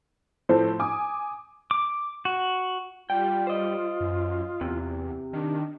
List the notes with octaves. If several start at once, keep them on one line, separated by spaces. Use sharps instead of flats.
A2 F3 C4 A4 C5
G#5 D6 D#6
D6
F#4
G3 F4 G5
C5 D#5
F#2
E2 C3
D#3 D4